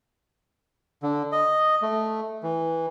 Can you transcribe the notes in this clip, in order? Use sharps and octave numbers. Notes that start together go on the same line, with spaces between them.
D3
D#5
A3
E3